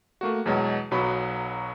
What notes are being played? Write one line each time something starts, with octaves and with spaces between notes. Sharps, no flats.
A3 A#3 F#4
E2 B2 F#3 G#3
B1 F#3 B3 F#4 B5